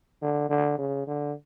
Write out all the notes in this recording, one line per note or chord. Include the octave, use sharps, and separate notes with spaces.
D3
D3
C#3
D3